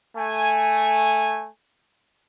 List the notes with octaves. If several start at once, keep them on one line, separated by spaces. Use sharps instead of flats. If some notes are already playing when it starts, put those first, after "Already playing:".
A3 G#5